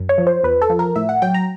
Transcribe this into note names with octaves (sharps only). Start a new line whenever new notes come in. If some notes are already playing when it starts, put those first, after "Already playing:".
Already playing: F#2
C#5
F3
C5
E2 B4
A4
F3
A#4
A2 E5
F#5
F#3 G5
A#5